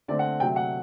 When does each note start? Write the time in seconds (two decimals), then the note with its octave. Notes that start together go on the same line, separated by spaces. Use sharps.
0.08 D3 A3 C4 D5
0.19 F#5
0.40 C3 F#3 A3 G5
0.56 F#5